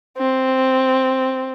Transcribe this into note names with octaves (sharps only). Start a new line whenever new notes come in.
C4